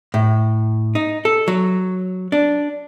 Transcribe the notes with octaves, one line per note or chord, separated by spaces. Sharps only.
A2
D#4
A4
F#3
D4